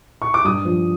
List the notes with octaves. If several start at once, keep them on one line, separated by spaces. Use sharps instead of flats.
C#6
D6
G2 D#6
F3